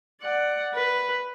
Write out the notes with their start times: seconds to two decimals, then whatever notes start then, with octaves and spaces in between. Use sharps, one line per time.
0.22 D5 F#5
0.74 B4